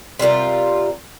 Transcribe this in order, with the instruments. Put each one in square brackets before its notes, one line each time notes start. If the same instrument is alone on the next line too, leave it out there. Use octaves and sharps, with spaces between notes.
[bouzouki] C3 G3 F4 A#4